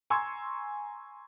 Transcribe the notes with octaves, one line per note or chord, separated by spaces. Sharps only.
G#5 A#5 C6 C#6 E6 G#6